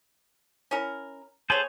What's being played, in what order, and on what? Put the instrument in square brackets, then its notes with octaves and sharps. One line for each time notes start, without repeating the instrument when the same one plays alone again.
[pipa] C#4 E4 A#4
[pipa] B3 C#5 [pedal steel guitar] G#4 A4 C5